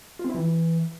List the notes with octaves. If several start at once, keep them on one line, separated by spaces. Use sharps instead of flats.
F4
C4
E4
E3